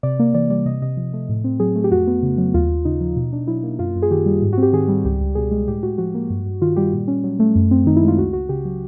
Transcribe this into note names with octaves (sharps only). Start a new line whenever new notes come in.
C3 D5
A#3
E3 D5
G3 D5
C3 D#5
C3 D#5
F3
A3
A2
C4
F#3 G#4
A3
G4
F2 F#4
B3
C#3
F#3
D#2 F4
D#2
C#3 D#4
F3
B2
D4
F#3 E4
A#3
F#2 F4
F#2
G#4
D#3 G4
G3
G#2
C4 F#4
G4
D#3 G#4
G3
C#2 G4
C#2
B2 G#4
G#3
A2 G4
A2 F#4
F3 F#4
A#3
G2
G2
D#3 F4
G3 G4
A#2
C#4
F#3
A3
F#2
C4
D#3 D#4
E4
G#3
F4
C#2 F#4
C#2 F#4
C#3 G4
F#3